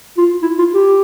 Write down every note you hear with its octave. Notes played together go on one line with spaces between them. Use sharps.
F4
E4
F4
G4